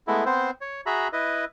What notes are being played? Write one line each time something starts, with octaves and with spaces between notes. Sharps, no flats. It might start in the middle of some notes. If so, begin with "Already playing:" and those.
G#3 A3 B3 E4
B3 C4 C5
C#5
F#4 G#4 E5 A#5 B5
E4 B4 D#5